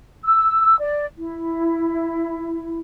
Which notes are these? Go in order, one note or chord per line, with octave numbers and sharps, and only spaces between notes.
E6
D5
E4